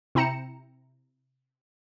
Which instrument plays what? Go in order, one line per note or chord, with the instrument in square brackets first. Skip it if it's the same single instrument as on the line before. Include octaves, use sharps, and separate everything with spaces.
[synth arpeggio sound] C3 E4 G5 A#5 C#7 E7